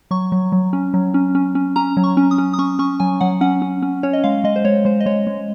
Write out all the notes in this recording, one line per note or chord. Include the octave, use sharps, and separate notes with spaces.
F#3 C#6
F#3
F#3
C#4
F#3
C#4
C#4
C#4
C#4 A#5
F#3
C#6
C#4
D#6
C#4
D#6
C#4 C#6
C#4 C#6
F#3 G#5
F#3 F#5
C#4 F#5
C#4
C#4
C#4 C#5
D#5
G#3 F5
G#3 D#5
C5
G#3 C#5
G#3 C5
D#5
G#3 C#5
G#3